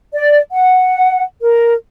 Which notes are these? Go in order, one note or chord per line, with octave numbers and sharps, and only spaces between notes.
D5
F#5
A#4